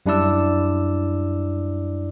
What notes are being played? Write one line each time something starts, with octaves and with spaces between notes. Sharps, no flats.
F#2 G3 D4 E4 D5 E6